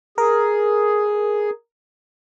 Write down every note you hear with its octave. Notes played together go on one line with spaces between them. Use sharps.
G#4 A#4